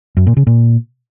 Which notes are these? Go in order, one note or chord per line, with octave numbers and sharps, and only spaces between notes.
F#2
A#2
C#3
A#2